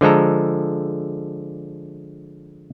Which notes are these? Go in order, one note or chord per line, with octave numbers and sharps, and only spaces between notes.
D3 F3 G#3 A4 A#5